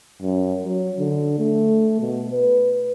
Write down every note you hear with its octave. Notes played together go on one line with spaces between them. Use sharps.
F#2
F#3
D3
A3
B2
B4